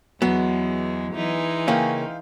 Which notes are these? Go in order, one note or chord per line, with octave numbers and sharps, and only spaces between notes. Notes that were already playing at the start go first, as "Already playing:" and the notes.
E2 F#3 G#3 B3
E3 G#3 D#4
C#3 A#3 C#4 F5 G5